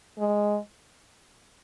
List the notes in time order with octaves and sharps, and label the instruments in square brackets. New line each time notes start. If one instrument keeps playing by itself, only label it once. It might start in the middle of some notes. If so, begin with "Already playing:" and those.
[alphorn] G#3